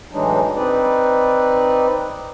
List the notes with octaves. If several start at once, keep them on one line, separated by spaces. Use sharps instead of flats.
A2 E3 F#3 G#3 D4 D#4
C4 D#4 B4 D5